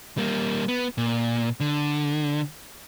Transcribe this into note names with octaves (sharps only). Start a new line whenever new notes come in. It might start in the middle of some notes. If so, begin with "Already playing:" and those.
G3 A#3
B3
A#2
D3